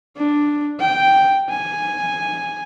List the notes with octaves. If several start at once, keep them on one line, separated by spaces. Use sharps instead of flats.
D4
G5
G#5